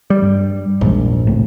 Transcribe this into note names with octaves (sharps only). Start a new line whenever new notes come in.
G3
G2
A#1 E2 G#2
G1 C2 A2